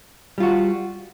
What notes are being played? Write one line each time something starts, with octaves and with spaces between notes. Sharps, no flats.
G3 F4 F#4